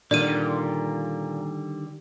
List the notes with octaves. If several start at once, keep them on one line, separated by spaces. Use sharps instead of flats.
A#2 D3 D#3 G3 D5 D#7